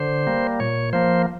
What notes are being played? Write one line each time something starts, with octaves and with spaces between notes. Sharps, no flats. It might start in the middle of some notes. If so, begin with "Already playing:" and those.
Already playing: D3 C5
G3 A#3
A#2 C#5
F3 A#3 C5